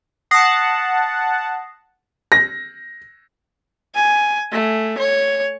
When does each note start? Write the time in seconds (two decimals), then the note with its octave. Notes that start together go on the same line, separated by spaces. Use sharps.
0.31 F#5 A5 D#6 A#6 C7
2.32 A#6
3.94 G#5
4.52 A3
4.98 C#5